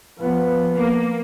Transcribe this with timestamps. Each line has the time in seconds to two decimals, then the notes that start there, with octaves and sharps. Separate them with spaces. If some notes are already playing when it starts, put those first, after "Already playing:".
0.19 F3 B3
0.77 A#3